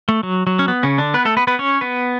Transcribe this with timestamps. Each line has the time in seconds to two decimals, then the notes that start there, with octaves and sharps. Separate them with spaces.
0.09 A3
0.23 F#3
0.47 F#3
0.59 C#4
0.68 B3
0.83 C#3 C#4
0.98 D3 D4
1.14 B3 B4
1.25 A3 A4
1.37 B3 B4
1.47 B3 B4
1.59 C#4 C#5
1.81 B3 B4